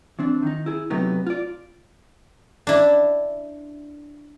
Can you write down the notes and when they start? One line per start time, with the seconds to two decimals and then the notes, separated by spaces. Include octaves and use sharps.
0.19 E3 C4 D4
0.43 D#3 D#4
0.66 E4 G#4
0.90 C3 F#3 A3 B3 D#4
1.27 F4 D5
2.67 D4 E4